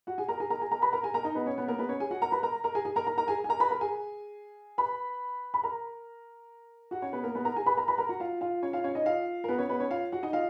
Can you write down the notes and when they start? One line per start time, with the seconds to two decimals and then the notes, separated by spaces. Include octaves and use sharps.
0.07 F#4 F#5
0.18 G#4 G#5
0.28 A#4 A#5
0.40 G#4 G#5
0.50 A#4 A#5
0.61 G#4 G#5
0.71 A#4 A#5
0.82 B4 B5
0.93 A#4 A#5
1.03 G#4 G#5
1.14 A#4 A#5
1.25 D#4 D#5
1.35 B3 B4
1.46 C#4 C#5
1.58 B3 B4
1.68 A#3 A#4
1.78 B3 B4
1.89 C#4 C#5
2.00 G#4 G#5
2.11 F#4 F#5
2.22 A#4 A#5
2.32 B4 B5
2.43 A#4 A#5
2.64 A#4 A#5
2.75 G#4 G#5
2.85 G#4 G#5
2.96 A#4 A#5
3.07 A#4 A#5
3.17 A#4 A#5
3.28 G#4 G#5
3.44 G#5
3.49 A#4 A#5
3.60 B4 B5
3.71 A#4 A#5
3.81 G#4 G#5
4.78 B4 B5
5.54 B5
5.64 A#4 A#5
6.91 F#4 F#5
7.02 C#4 C#5
7.13 B3 B4
7.24 A#3 A#4
7.35 B3 B4
7.45 A#4 A#5
7.56 G#4 G#5
7.66 B4 B5
7.77 A#4 A#5
7.88 B4 B5
7.98 A#4 A#5
8.09 F#4 F#5
8.20 F4 F5
8.41 F4 F5
8.62 C#4 C#5
8.73 F4 F5
8.84 C#4 C#5
8.95 D#4 D#5
9.06 F4 F5
9.44 A#4
9.48 B3 B4
9.58 C#4 C#5
9.69 B3 B4
9.80 C#4 C#5
9.90 F4 F5
10.12 F#4 F#5
10.23 D#4 D#5
10.33 F4 F5